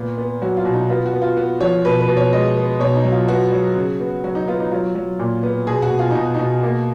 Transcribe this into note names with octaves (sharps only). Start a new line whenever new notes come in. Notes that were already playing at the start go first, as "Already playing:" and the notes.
Already playing: A#2 B3
B3
F#3 F#4
F4
B2
D#4
B3 F4
F#4
B3
F4
B3 F#4
F3 C#5
B2 B4
B4
B2
C#5
G#3 D#5
B3
B2 C#5
D#4
F#3
F4
B3 F#4
F#3
C#3
B3
F#3 F#4
D#4
B3 F4
D#4
F#3 F4
F#3
A#2
B3
B2 G#4
F#4
B2
F4
B2 D#4
B2 D#4
A#3